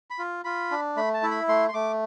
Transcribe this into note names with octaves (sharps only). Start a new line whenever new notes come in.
B5
F4
F4 B5
D4
A3 B5
A5
E4
B5
A3 C6
C6
A3 D6